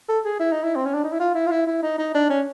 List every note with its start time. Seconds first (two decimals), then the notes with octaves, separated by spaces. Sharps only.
0.08 A4
0.25 G#4
0.40 E4
0.52 D#4
0.63 E4
0.76 C4
0.85 C#4
0.94 D4
1.04 D#4
1.12 E4
1.20 F4
1.35 E4
1.46 F4
1.51 E4
1.67 E4
1.82 D#4
1.98 D#4
2.14 D4
2.29 C#4